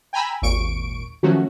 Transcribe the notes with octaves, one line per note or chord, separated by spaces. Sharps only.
G5 G#5 A#5 B5 E6
G#1 D#2 A#2 C#6 D7
D#3 F3 F#3 A3 C#4 F#4